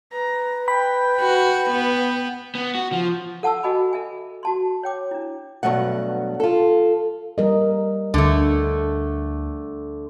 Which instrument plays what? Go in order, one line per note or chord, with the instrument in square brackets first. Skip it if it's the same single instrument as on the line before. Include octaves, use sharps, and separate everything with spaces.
[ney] B4 [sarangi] A#5
[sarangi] G5 [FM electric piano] B5
[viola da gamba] F#4
B3
[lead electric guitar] B3
F#4
F3
[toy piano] A4 F#5 A5 C#6 E6
F#4 D#5 G#5 B5 D6
A4 E5 G#5
F#4 A5 C6
C#5 G5 D6
D4 E4
[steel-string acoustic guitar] G2 B2 F#3 A3 F#5
F4 A4
[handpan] G3 A#4 D#5
[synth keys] D2 [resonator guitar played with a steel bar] D3 A3